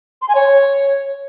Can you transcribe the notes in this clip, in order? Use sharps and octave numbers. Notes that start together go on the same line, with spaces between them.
C6
G#5
C#5